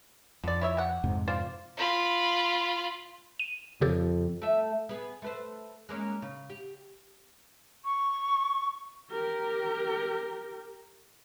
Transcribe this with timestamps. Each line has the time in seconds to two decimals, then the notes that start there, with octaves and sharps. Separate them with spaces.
0.44 F2 D3 D5
0.61 E4 C#5 E5
0.77 G4 F#5
1.04 F2 G#2 C3
1.28 F4 C5 D5
1.77 F4 B5
3.40 D#7
3.81 F2 C#3 G4 A4
4.42 A3 E5
4.89 B3 G#4
5.22 A3 B4 C5
5.89 G#3 A#3 C#4
6.22 C#3
6.50 G4
7.85 C#6
9.11 G4 A#4